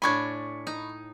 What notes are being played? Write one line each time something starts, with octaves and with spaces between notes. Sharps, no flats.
A2 D4 G#5 B5 C#6 G#6
D#4